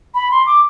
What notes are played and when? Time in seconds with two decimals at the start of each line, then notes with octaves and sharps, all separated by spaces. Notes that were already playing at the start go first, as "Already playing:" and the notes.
0.15 B5
0.31 C6
0.46 D6